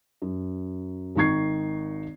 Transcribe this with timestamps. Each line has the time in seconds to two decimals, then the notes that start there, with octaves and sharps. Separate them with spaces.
0.22 F#2
1.15 G#1 D#3 D#4 C#6 G#6 C7